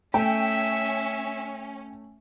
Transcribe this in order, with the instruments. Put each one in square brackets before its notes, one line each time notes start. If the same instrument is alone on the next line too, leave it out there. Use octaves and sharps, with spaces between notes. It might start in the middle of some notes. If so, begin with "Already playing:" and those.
[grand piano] A3 [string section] C#4 [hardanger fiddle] E5 [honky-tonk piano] G5